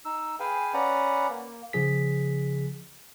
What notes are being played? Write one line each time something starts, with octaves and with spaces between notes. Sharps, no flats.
D#4 E6
G#4 B4 F5 G5 G#5
C#4 B4 D5 F#5 A#5
A#3
C#3 F3 G#4 B6